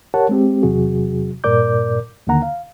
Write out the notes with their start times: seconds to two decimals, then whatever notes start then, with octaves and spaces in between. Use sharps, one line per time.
0.14 G4 A#4 C#5 F#5 A5
0.29 G#3 C4 G4
0.63 E2 C3 F#3 F#4 G#4
1.44 G2 A#2 A#4 D5 D6 G6
2.27 D#2 D3 D#3 A#3 F#5 A#5
2.42 F5